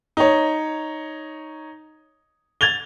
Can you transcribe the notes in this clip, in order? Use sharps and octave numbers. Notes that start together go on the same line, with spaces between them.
D#4 C#5
G#6 A6 F7 G7